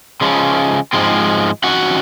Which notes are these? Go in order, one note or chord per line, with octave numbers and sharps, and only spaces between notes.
C#3 F3 G#3 C#4
G#2 F3 G#3 C4
F2 D#3 F#3 C#4 F#4 F#5